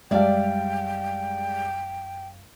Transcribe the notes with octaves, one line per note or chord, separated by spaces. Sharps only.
F#2 G3 G#3 D5 E5 F5 G5